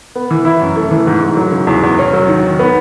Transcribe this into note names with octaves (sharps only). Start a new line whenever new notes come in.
B3
E3
E4
F#2
A3
E3
G#2
G#2
F#3
C#3
E2
E2
C#4
F#3
D#3
D#3
B3